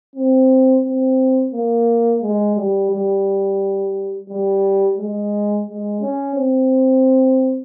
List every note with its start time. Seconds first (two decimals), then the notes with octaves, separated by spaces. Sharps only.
0.15 C4
0.84 C4
1.53 A#3
2.22 G#3
2.56 G3
2.91 G3
4.29 G3
4.97 G#3
5.66 G#3
6.01 C#4
6.35 C4